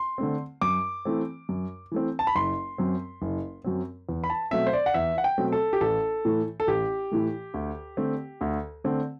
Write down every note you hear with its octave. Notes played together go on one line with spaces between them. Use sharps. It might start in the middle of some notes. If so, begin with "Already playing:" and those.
Already playing: C6
D3 A3 C4
F#2 D6
E3 A3 C4
F#2
E3 A3 C4
A5
B5
F#1 C6
F#2 F#3 C4
F#1
F#2 F#3 C4
E2
B5
A5
B2 F#3 A3 C4 E5
C5
D5
F#5
E2 E5
F#5
G5
B2 F#3 A3 C4
A4
G4
A1 A4
A2 E3 A3
A4
A1 G4
A2 E3 A3
D2
D3 A3 C4
D2
D3 A3 C4